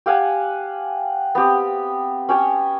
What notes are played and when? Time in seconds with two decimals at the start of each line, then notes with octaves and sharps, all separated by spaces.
0.06 G4 F5 F#5 G#5
1.35 B3 C4 G4
2.29 C#4 G4 C#5 G5